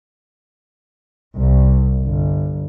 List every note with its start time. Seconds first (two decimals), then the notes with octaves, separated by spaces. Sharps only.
1.37 C2
2.03 G1